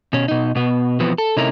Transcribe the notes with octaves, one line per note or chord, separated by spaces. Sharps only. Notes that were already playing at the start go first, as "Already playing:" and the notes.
B2 C#4
B2 D#4
B2 B3
B2 E3 F3 B3 C4
A4
C3 A3 C#4 D#4 E4 A#4